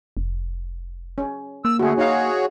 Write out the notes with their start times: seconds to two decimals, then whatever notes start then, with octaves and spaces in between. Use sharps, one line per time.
0.17 F1
1.18 C#4
1.65 A#3 E6
1.79 D3 A3 F#4 G#4
1.98 D#4 F#4 G#4 C#5 F5